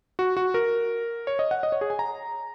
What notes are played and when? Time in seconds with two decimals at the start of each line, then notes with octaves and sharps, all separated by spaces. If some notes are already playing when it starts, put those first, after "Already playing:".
0.19 F#4
0.37 F#4
0.54 A#4
1.27 C#5
1.39 D#5
1.51 F#5
1.63 D#5
1.72 C#5
1.81 G#4
1.90 G#5
1.99 A#5